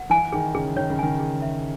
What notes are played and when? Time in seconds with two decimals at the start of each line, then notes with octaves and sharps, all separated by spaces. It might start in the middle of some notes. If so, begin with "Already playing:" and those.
Already playing: F#5
0.10 E3 G#5
0.32 D#3 G#4
0.55 C#3 G#4
0.76 D#3 C#5
0.90 C#3
0.99 D#3 G#5
1.20 G#4
1.42 E5